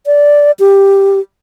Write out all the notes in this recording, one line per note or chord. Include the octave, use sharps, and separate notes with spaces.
D5
G4